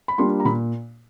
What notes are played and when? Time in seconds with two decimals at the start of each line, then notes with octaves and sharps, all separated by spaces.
0.08 B5
0.18 G3 A#3 D4 F4 C6
0.40 A#5
0.45 A#2 B5